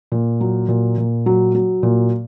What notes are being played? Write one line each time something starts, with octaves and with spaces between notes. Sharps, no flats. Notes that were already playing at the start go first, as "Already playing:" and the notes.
A#2
F#3
A#2
A#2
F#3
F#3
A#2